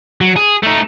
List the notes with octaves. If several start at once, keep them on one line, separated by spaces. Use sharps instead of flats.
F#3
G#4
A3 D#4